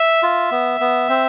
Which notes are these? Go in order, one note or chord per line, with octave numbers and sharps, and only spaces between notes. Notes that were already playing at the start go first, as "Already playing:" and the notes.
Already playing: E5
F4
B3
B3
C4